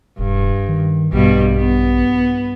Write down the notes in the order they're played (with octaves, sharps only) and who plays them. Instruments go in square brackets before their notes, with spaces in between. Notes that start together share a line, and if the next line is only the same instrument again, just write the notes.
[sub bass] E1 [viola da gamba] G2
[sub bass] D#3
[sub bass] A#1 [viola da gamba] G2 B2 G3
[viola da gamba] B3